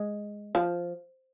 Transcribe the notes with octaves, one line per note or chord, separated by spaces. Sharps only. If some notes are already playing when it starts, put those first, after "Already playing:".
Already playing: G#3
F3